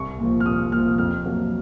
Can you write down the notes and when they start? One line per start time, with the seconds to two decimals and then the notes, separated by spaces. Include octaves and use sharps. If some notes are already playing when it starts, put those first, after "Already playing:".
Already playing: C2 C#6
0.19 A#2 F3
0.40 F6
0.45 C2 D#6
0.72 A#2 F3 F6
0.98 F2 F6
1.25 C3 F#3 A#3